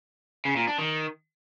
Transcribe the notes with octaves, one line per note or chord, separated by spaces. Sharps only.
C#3
A#2
D4
D#3